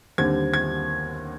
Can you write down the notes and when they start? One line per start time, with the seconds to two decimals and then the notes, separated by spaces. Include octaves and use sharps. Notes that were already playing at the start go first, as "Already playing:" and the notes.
0.18 D#2 D3 G3 C4 G#6
0.54 G#6